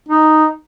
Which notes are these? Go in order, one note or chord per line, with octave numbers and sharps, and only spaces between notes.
D#4